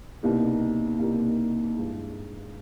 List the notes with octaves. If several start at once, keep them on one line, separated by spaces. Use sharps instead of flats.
C2 B2 G3 A#3 D#4
C2 B2 G3 A#3 D#4
G2 E3 G#3